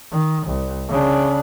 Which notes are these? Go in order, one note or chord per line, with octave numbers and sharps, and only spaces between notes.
D#3
C2
C#3 D4